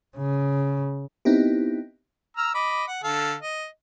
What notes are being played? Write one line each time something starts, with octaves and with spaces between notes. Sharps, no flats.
C#3
B3 C4 D#4 E4 G4
A#5 E6 F6
D#5 B5 D6
F#5
D3 A4 F5
D#5